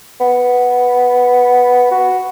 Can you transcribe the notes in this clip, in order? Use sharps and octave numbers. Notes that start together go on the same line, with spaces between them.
B3
F#4